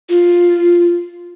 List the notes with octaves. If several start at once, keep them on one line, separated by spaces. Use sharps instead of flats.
F4